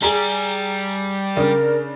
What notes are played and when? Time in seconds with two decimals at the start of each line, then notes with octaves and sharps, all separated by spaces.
0.03 G3 G#4 A#5
1.37 C#3 D4 A#4